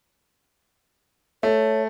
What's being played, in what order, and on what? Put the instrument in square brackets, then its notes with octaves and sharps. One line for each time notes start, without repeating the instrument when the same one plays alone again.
[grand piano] A3 [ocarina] C#5